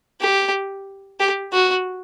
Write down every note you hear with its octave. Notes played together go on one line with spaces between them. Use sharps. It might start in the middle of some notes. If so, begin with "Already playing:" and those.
G4
G4
F#4